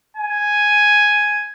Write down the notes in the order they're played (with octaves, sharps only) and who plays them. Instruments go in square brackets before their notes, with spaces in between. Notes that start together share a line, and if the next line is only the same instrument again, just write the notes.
[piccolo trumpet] G#5